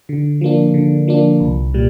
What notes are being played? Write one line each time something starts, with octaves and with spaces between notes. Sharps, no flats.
D3
F3 A#3 D4
D3
F3 A#3 D4
C2
A#2 G3